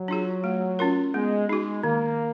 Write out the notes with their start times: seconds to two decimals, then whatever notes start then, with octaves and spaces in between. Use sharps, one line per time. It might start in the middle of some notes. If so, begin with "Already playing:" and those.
Already playing: F#3
0.08 D4 F4 G#4
0.44 A3
0.79 C#4 F4 A#4
1.14 G#3 B3
1.49 G#3 D#4 F#4
1.84 D#3 A#3